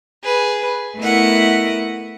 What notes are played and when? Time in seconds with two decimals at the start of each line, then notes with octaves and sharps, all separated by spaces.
0.23 G#4 B4
0.97 A3 B3 E4 A#4 D#5 F#5